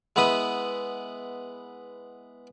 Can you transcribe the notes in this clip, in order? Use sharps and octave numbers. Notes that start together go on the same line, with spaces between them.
G#3 B3 E4 B5 D#6